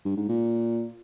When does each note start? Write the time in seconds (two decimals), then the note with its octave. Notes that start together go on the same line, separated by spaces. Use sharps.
0.05 G2
0.17 G#2
0.29 A#2